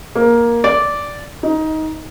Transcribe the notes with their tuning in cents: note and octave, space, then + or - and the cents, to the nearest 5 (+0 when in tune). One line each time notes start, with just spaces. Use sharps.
A#3 +10
D5 -10
D#4 +15